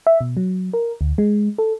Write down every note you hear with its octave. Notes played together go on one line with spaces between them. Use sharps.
E5
B2
F#3
A#4
D2
G#3
A4